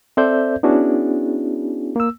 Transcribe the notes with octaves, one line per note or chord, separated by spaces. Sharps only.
C4 A4 C5 D5 E5 G6
B3 C#4 D4 E4 F#4 G#4
A#3 E6